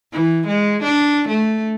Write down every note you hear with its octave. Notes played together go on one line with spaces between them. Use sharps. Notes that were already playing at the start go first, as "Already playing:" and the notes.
E3
G#3
D4
A3